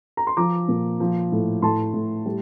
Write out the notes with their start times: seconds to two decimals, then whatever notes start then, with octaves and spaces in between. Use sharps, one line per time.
0.17 A#5
0.27 C6
0.37 F3 A#5 D6
0.68 A#2
1.00 F3
1.32 A2
1.62 A2 A5 C6
1.94 A2
2.26 G3